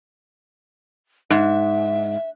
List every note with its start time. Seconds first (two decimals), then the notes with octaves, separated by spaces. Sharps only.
1.30 G#2 E5